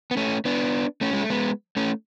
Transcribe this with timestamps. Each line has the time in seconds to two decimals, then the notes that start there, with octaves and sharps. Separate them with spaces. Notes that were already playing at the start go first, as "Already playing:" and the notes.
0.11 B3
0.17 A3 C#4
0.45 B3 D4
1.01 A3 C#4
1.13 G#3
1.21 A3
1.30 G#3 B3
1.77 A3 C#4